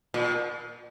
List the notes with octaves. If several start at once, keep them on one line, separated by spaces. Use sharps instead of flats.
A#2